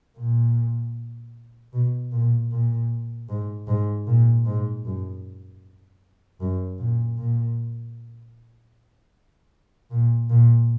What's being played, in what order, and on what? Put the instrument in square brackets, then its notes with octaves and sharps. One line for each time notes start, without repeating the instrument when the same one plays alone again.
[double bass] A#2
B2
A#2
A#2
G#2
G#2
A#2
G#2
F#2
F#2
A#2
A#2
A#2
A#2